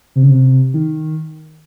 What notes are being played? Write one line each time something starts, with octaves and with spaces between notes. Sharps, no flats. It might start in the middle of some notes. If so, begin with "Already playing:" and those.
C3
C#3
C3
D#3